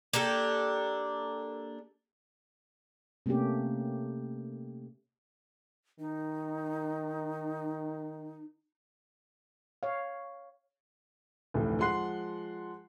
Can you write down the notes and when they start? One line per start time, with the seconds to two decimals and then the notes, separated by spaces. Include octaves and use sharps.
0.13 A#3 D4 G4 A4
3.26 C3 A3 A#3 C#4 G4
5.99 D#3 D#4
9.83 C#5 F5
11.54 F1 D2 A2 E3
11.79 F3 G#3 F#5 C6 F#6 C7